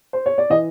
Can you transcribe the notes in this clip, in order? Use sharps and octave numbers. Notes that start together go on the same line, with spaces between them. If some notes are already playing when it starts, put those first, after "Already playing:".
C5
C#5
D5
E3 D#5